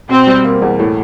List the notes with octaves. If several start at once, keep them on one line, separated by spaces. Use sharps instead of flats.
B2 C4
G3
A#3
E2
A2